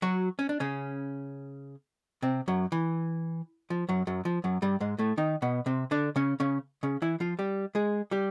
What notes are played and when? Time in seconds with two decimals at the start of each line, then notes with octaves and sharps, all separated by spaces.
0.02 F#3 F#4
0.39 C#4
0.49 D4
0.60 C#3 C#4
2.23 C3 C4
2.48 F#2 F#3
2.72 E3
3.70 F3
3.89 F#2 F#3
4.07 F#2 F#3
4.25 F3
4.44 F#2 F#3
4.62 G2 G3
4.80 G#2 G#3
4.99 A2 A3
5.17 D#3 D#4
5.42 B2 B3
5.66 C3 C4
5.91 D3 D4
6.16 C#3 C#4
6.40 C#3 C#4
6.83 C#3 C#4
7.02 E3 E4
7.20 F3 F4
7.39 G3 G4
7.75 G#3 G#4
8.11 G3 G4